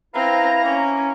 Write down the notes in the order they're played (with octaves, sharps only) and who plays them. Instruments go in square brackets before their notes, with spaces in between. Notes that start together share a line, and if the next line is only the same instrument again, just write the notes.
[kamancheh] C4 [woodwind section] E4 F5 A#5 [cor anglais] B4
[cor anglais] A#3 [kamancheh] C#4